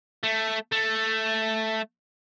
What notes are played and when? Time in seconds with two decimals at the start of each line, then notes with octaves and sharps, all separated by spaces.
0.23 A3
0.72 A3